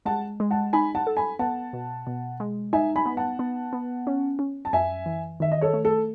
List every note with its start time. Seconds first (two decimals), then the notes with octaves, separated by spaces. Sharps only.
0.05 G#3 F#5 A5
0.40 G#3
0.51 F#5 A5
0.73 D#4 G#5 B5
0.95 F#5 A5
1.07 A4
1.17 G#5 B5
1.39 B3 F#5 A5
1.73 B2
2.07 B2
2.40 G#3
2.73 D#4 E5 G#5
2.96 G#5 B5
3.06 B3
3.17 F#5 A5
3.39 B3
3.73 B3
4.07 C#4
4.39 C#4
4.65 A5
4.73 F#2 E5 G#5
5.06 E3
5.40 D#3 E5
5.52 D#5
5.61 A4 C#5
5.74 A3
5.85 A4